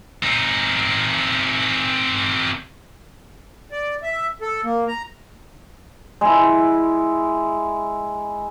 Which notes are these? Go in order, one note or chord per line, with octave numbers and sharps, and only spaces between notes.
C4 D#4
D5
E5
A4
A#3
A#5
G#3 E4